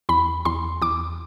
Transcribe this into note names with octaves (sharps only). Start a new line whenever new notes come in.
E2 B5
E2 C6
E2 D6